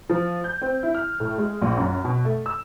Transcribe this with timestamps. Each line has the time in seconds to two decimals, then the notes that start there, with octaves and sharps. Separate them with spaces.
0.10 F3
0.44 G6
0.62 C4
0.83 E4
0.95 F6
1.20 A2
1.38 G#3
1.62 A#1
1.77 F#2
2.05 B2
2.25 A3
2.46 E6